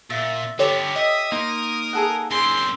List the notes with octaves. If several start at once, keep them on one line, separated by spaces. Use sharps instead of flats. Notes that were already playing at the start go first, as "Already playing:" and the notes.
A#2 E5 A6
D3 B3 G4 A4 C#5
D#5 E5 D#6
A#3 D#4 A#4 C6
G#4 A4 F#5
F#2 C4 G#4 C6